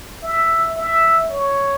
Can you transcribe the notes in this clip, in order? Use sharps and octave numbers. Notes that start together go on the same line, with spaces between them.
E5
E5
C#5